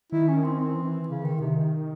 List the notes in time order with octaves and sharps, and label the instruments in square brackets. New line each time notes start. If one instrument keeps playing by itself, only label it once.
[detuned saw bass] D#3 [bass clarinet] E4
[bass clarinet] C#4
C4
C4
[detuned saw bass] E3
[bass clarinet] C#3
D#3
[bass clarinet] C3 [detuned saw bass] D#3